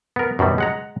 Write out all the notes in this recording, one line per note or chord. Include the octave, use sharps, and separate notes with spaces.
B3 A#4
F#2 B2 D#3 G3
G#3 F#5 A#5